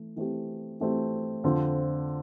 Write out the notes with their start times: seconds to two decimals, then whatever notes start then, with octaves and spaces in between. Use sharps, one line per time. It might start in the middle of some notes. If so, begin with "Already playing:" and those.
Already playing: E3 A3
0.16 E3 A3 C4 G4
0.80 E3 A3 C4 G4
1.44 F2 D3 F3 C4 F4